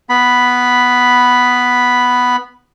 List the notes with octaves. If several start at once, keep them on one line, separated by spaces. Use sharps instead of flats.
B3 B5